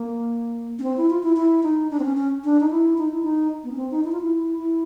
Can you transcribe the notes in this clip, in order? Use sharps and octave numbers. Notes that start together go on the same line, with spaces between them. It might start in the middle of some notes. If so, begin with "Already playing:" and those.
Already playing: A#3
C#4
C4
E4
F4
E4
E4
D#4
D4
C4
C#4
C#4
D4
D#4
E4
D#4
E4
D#4
B3
C#4
C4
D#4
E4
F4
E4
E4